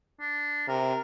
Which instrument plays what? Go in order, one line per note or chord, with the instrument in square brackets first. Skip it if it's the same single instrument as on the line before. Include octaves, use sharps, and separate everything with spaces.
[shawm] D4
[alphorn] C3 [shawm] A#4